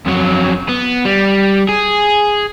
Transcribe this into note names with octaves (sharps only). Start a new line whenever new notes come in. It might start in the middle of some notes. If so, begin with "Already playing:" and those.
F2 F#3
B3
G3
G#4